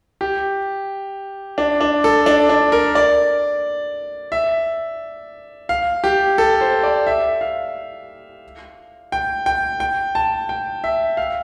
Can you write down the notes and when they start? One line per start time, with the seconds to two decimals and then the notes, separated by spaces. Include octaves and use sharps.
0.21 G4
1.58 D4
1.81 D4
2.04 A4
2.26 D4
2.50 D4
2.72 A#4
2.95 D5
4.32 E5
5.69 F5
6.04 G4
6.38 A4
6.61 C5
6.83 D5
7.07 E5
7.41 F5
9.12 G5
9.46 G5
9.80 G5
10.15 A5
10.49 G5
10.84 E5
11.17 F5